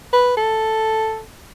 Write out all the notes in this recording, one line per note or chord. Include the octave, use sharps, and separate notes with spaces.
B4
A4